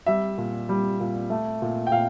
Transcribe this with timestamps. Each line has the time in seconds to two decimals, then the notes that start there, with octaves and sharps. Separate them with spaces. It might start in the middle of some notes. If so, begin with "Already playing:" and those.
0.06 G3 E5
0.38 A#2
0.69 G3
1.00 A#2
1.30 A3
1.62 A#2
1.87 G5
1.92 A#2 F5